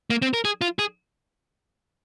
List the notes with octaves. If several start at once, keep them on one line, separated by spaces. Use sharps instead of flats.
A#3
C4
A#4
G#4
F4
G#4